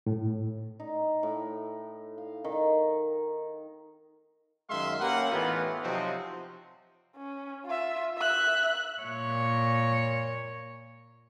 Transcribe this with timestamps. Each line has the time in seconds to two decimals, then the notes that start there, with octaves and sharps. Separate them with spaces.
0.06 A2
0.80 D#4
1.23 A2
2.18 F5
2.44 D#3
4.69 F#2 D#3 G#3 E5 F5 C6
5.00 A#3 C#4 G4 B4 F#5
5.31 A2 E3 B3 D#4 F4
5.82 C3 F3 F#3 C4 D#4 F#4
7.16 C#4
7.65 F4 E5
8.17 E5 F#6
9.03 A#2 C#5